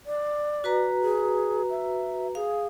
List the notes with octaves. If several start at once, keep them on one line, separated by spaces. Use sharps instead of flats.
D5
F#4 B4 A#5
G#4
E5
G#4 F5